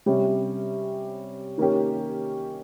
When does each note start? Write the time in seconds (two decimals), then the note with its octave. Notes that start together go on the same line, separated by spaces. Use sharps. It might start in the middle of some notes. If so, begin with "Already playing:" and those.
0.06 C3 G3 C#4 G4
1.58 D#3 A#3 C#4 G4